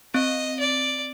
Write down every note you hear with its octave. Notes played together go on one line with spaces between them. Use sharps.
C4 D#5
D5